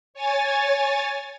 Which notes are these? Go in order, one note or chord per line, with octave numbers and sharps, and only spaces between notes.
C#5 G#5 A6